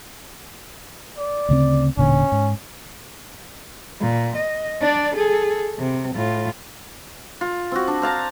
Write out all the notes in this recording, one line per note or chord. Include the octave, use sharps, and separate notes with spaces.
D5
D2 C#3 C4
E1 A#2 D3 C#4
G#2
A#2
D#5
D4 D5
G#4 A4
C3
A2 F4
F4
C4 F#4
D4
C5 F5 A5 A#5